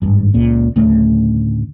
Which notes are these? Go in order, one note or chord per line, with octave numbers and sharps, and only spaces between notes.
G#1 G2
C#2 A#2
D1 D2 C#3 A3